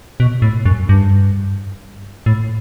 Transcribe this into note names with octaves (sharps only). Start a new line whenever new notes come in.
B2
A2
F#2
G2
A2